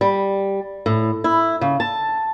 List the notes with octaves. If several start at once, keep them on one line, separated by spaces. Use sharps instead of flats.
G3
A2
E4
C#3
A5